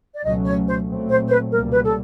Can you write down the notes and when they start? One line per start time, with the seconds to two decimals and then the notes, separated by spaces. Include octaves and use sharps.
0.13 D5
0.24 C#2 B2 F#3 A3 C#4 D#5
0.46 C#5
0.67 C5
0.88 A#2 F#3 A3 C4
1.09 C5
1.27 C5
1.30 B4
1.52 C#2 B2 G3 A#3 A#4
1.72 B4
1.84 A4